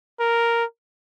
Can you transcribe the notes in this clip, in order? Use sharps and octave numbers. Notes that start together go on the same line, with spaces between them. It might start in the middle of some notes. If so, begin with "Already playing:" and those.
A#4